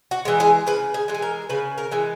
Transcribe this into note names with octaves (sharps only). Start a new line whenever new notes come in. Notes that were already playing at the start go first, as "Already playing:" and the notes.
F#4
E3 G#3
G#4
C#3 B4
G#4
E3 G#3
G#4
A#4
C#3 B4
A#4
E3 G#3